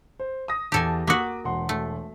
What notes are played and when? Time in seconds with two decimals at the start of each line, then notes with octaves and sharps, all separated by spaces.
0.20 C5
0.48 D#6 A#6
0.72 E2 G4 A4 G#5 A5
1.07 A#3 F#4 D6 D#6 B6
1.44 E1 F#5 C6
1.69 A3